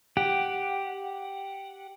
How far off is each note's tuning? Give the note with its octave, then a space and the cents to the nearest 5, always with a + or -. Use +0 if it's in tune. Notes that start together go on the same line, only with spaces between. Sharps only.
G4 +0 F#5 +0